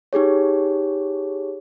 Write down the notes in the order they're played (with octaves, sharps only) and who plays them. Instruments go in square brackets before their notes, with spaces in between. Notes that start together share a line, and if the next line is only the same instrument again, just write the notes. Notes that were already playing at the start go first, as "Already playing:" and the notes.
[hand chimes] D#4 G4 G#4 C#5